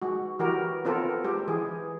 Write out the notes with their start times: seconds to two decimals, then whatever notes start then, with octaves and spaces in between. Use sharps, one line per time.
0.02 G#3 F#4
0.39 E3 F#4 G4 A#4
0.85 B3 C4 F4 A4 A#4
1.24 G#3 G4 C5
1.48 E3 G#4